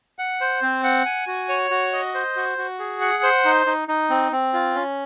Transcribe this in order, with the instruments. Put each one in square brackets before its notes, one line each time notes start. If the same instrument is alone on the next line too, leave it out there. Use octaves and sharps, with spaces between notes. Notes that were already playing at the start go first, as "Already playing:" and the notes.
[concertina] F#5
C5
C4
F#5
G#5
F#4
C#5
F#4
D#5
C5
F#4
F#4
G#4
F#5
C5
D#4
D#4
D#4
C4
C4
F4
C#4